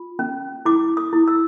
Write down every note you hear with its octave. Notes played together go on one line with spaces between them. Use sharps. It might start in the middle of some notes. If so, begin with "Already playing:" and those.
Already playing: F4
C#4
E4 D6
D#6
E4
E6